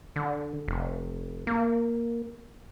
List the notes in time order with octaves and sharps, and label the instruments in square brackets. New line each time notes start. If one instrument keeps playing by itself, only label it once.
[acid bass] D3
F1
A#3